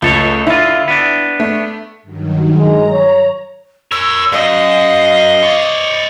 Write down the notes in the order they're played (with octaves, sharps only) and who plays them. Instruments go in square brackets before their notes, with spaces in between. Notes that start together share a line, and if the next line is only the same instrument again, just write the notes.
[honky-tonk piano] C#2 [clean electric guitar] A3 A4 C#5
[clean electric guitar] D3 F4 [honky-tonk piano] E4
[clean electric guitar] B3 D4
[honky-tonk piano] A3
[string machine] G2 D#3 F#3
[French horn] G#3 [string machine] A#5
[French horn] C#5
[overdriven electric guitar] A#4 C#5 [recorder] E6
[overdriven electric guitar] F#2 [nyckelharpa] D#5 [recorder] F5
[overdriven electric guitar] C#5 D5